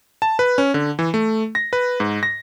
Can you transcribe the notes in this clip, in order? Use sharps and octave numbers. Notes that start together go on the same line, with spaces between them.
A5
B4
C#4
D3
E3
A3
A#6
B4
G#2
A#6